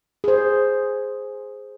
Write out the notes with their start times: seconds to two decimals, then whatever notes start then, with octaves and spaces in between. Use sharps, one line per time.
0.24 G#4 C5